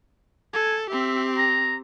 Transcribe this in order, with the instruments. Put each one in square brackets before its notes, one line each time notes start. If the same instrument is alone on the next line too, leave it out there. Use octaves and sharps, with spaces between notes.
[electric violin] A4 [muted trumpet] G#5
[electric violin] C4 G4 [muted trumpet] E5
[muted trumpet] A#5